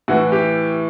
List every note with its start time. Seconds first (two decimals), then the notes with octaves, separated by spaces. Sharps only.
0.08 A2 E3 F#4
0.32 G4